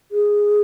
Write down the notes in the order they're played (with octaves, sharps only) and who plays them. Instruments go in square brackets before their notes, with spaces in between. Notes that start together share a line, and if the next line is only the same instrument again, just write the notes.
[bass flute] G#4